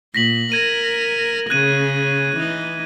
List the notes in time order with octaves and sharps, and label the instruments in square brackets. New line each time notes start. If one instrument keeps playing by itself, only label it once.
[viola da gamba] A#2 [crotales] A#6 B6 F#7
[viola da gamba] A#4 [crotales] G#6 D#7
[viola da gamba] C#3 C#4 [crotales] F#6 G#6 D#7
[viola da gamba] E3 D#4